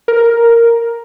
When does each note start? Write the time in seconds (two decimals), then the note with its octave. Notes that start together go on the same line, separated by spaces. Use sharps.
0.08 A#4